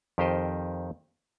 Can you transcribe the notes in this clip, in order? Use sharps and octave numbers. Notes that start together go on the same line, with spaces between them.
F2 D#3 G4 A#4 C5 D#5